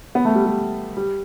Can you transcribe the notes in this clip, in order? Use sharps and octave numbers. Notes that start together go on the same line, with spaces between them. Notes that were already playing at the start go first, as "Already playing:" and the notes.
B3
A3
G3
G3
G3